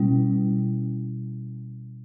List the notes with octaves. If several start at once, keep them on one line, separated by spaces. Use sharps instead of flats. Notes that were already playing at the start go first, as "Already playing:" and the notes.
Already playing: B2 G3 C#4 E4